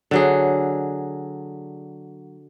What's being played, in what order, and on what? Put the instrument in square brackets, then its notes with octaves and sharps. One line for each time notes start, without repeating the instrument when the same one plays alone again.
[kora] D3 F#3 G#4